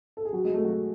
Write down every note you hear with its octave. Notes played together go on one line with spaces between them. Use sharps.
A4
G#4
F#3 F#4
G#3 G#4
A3 A4
F#3 F#4